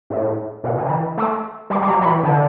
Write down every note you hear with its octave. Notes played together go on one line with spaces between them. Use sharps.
A2
B2
C#3
D3
E3
A3
G3
G3
F#3
F#3
E3
D3